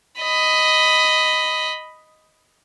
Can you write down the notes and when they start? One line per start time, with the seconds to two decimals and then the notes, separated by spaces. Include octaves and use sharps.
0.20 D#5 B5